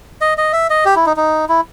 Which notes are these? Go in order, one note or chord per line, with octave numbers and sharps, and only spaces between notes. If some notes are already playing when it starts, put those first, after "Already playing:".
D#5
D#5
E5
D#5
G4
E4
D#4
D#4
E4